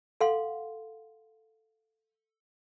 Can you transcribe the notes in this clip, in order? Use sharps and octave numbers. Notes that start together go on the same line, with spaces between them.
A4 F5 F#5 C6